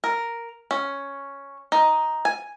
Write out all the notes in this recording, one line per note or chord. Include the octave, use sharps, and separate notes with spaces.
A#4
C#4
D#4
G#5